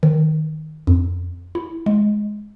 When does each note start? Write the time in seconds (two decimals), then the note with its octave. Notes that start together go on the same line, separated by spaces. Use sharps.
0.03 D#3
0.87 F2
1.55 E4
1.86 G#3